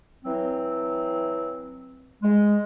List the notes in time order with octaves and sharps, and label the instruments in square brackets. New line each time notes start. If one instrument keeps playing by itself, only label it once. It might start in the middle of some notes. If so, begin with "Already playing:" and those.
[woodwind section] E3 F#3 C4
G#3